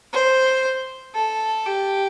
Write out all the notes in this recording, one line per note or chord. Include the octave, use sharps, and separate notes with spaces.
C5
A4
G4